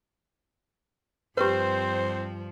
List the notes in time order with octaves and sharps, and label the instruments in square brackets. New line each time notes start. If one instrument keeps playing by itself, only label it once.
[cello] G2 F3 [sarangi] C4 [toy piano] G4 B4 [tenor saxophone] C5